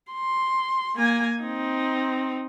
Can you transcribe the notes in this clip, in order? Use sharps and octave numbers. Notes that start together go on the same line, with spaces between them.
C6
A#3 G#5
C4 D#4